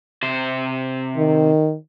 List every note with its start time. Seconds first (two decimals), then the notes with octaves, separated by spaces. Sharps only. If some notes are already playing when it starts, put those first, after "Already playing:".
0.23 C3 C5
1.17 D#3